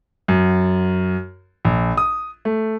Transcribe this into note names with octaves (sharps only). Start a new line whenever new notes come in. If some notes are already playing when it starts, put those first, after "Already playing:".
F#2
A#1
D#6
A3